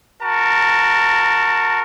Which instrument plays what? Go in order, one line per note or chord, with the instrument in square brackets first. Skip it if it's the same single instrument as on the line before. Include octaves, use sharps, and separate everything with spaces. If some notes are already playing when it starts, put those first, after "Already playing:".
[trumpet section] F#4 A#4 A5